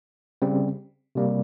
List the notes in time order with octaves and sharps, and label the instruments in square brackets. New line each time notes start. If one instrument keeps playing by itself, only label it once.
[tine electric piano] C#3 G3 C4
C3 G3 A#3